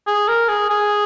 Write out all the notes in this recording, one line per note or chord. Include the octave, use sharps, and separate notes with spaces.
G#4
A#4
G#4
G#4